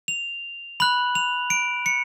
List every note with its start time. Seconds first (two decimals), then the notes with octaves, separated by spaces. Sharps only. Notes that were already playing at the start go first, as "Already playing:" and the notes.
0.08 F7
0.80 B5 F#6 F#7
1.15 F7
1.50 D7
1.86 C#7